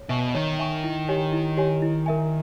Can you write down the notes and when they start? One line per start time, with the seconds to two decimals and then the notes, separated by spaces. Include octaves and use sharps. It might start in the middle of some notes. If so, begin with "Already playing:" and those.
Already playing: C#5
0.09 B2 E5 G#5 C#6
0.34 D#3 C#5
0.59 E5 G#5 C#6
0.84 E4
1.08 G4 C#5 G#5
1.33 E4
1.57 G4 C#5 G#5
1.82 E4
2.06 A#4 E5 G#5